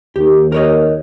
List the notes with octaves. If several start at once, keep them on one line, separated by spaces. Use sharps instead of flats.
D#2 G4
A#4 C#5 D#5